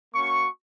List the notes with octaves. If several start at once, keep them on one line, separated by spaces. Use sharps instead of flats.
A#3 C#4 F#4 C#6